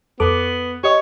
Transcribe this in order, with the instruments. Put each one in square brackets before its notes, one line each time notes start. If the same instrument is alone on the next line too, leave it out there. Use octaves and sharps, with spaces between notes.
[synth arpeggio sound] F2 A4 D6 [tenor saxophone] B3
[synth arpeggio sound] G4 D#5 C#6 [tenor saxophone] C#5